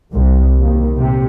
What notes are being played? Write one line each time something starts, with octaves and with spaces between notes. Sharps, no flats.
C2
D#2
C3